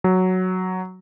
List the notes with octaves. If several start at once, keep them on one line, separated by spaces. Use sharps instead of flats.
F#3